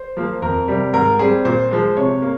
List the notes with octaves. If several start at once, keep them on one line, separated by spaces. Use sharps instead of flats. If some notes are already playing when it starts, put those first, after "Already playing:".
Already playing: C5
F3 A#3
F2 A#4
C3 G3
G#2 A#4
G3 C4 G#4
A#2 C5
F3 G#3
C3 C#5
A#3